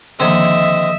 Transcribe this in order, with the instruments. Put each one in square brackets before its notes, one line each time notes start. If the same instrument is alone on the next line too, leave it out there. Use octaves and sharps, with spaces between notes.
[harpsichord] D3 C4 [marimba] D#3 F3 A#3 [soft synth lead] D#5 [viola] E5